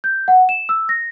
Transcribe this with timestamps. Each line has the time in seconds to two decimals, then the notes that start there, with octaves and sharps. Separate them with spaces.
0.04 G6
0.28 F#5
0.49 E7
0.69 E6
0.89 A#6